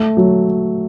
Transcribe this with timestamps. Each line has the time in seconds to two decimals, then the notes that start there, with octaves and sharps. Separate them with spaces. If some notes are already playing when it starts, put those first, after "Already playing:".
Already playing: A3
0.17 F#3